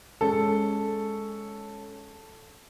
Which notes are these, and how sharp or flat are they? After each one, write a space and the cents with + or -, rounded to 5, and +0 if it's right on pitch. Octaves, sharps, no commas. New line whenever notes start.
G#3 +0 C#4 +0 A4 +0